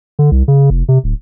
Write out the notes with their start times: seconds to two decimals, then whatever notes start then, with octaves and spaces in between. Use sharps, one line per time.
0.19 D3
0.31 C2
0.48 C#3
0.70 F1
0.88 C3
1.04 D1